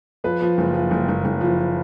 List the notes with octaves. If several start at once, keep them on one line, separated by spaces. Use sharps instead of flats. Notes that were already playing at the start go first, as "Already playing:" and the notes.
F3 B4
F3
F#1
F3
F#1
F#1
F#1
F3